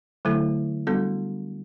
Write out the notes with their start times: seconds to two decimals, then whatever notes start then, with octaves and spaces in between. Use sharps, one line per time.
0.25 D3 F#3 A3 E4 A4
0.87 G3 B3 D4 F#4 A4